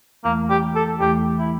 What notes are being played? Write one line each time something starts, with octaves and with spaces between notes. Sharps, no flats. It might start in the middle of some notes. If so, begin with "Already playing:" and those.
E2 E3 A3 A#3
G4
A4
E2 E3 A3 G4
E4